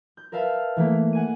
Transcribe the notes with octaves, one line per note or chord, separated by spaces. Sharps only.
G6
A#4 B4 E5 F5 A5
E3 A3 A#3
F#5 G#5 D#7